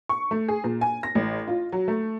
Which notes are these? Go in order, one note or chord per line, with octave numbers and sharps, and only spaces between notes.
C#6
A3
G#4
A#2
G#5
A#6
A1
F4
F#3
A3